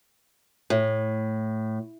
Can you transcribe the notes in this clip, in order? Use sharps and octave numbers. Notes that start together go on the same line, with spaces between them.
A2